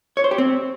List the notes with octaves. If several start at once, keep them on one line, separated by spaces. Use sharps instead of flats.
C#5
C5
G4
C4